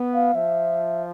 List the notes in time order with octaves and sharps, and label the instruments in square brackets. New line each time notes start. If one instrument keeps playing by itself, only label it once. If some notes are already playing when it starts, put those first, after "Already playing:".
Already playing: [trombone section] B3
[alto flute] F5
[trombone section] F3 [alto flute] E5